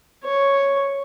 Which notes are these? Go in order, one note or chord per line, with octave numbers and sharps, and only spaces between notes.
C#5